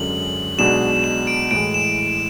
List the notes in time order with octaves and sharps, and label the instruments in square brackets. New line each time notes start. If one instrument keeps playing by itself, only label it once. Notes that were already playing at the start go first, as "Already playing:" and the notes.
Already playing: [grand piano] F#2 D3 G#3 C#4 G#4 [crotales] F#7
[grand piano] B1 B2 G#3 D4 F#4 [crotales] E7
[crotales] E7
D7
[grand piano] A2 E3 G#3 [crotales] D7
[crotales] E7